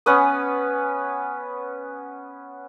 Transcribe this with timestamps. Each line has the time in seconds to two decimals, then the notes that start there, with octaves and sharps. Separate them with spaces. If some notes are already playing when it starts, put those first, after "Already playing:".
0.06 B3 C#4 B4 D#6